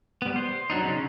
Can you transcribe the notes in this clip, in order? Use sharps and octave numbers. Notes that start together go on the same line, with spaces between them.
G3 B3
C5
F#3 D4 D#4
C#3 C#4 D#4